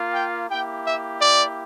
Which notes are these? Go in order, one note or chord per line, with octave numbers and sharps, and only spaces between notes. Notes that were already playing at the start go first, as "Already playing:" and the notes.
Already playing: A#3 F4
G5
A#3 E4 G4 G5
E5
D5